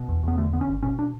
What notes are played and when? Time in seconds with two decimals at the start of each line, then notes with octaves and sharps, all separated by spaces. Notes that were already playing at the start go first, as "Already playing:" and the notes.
Already playing: B2
0.09 E2
0.23 E2 B3
0.38 D3 A3
0.53 D3 B3
0.61 C#4
0.68 G1
0.83 B2 C#4
0.99 D4